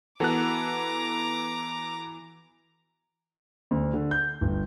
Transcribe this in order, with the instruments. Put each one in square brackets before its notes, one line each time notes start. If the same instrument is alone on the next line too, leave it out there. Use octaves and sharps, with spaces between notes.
[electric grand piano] E3 B3 F#6 [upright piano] F#4 A4 F#5 [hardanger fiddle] A#5 D6
[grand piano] D2
D3
G6
G1